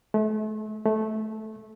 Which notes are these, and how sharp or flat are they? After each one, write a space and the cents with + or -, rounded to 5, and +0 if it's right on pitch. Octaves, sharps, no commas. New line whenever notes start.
A3 -35
A3 -15